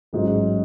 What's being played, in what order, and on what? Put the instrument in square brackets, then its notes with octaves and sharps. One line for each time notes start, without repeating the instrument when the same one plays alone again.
[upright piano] A1 G#2 F#3